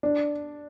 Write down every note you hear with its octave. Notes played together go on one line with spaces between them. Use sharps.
D4